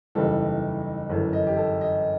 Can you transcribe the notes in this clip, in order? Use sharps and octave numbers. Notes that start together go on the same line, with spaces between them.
F#1 E2 D#3 G3 A4
G1 F#2 E3 A3
D#5
G4
A4
D#5